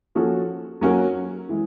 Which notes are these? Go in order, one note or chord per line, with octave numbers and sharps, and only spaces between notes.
F3 A#3 C#4 F#4 A4
F#3 A#3 C#4 F#4 A#4
E3 G#3